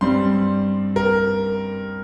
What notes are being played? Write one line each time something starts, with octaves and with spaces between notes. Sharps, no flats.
G2 G3 C4 C6
A#4